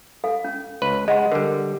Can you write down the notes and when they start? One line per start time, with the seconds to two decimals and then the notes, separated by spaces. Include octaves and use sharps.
0.24 A4 F5
0.44 C#4
0.82 C#2 B4
1.08 G#3 D#5 F#5 C6
1.32 D3 G3 A#4